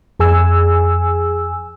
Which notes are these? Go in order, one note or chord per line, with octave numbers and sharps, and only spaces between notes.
F2 G#4 G#5 E6